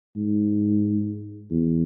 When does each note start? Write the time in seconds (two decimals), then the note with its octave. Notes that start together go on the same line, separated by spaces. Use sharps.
0.16 G#2
1.51 E2